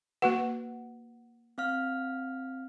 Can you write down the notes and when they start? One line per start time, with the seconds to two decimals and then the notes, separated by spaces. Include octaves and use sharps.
0.22 A#3 F#4 B4 F#5
1.58 C4 F5 F6